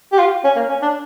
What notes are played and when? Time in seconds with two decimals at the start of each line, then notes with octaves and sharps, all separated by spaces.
0.13 G4
0.19 F4
0.44 C#4
0.56 A#3
0.69 C#4
0.82 D4